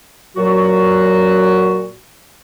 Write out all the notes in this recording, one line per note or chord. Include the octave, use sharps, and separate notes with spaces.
A#2 F#3 F#4